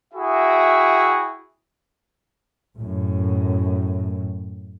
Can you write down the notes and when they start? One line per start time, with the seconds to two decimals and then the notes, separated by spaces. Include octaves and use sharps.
0.14 E4 F#4 G#4 E5 G5
2.76 F#2 A2